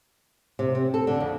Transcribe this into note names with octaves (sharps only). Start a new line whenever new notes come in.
C3
C4
A4
D3
F2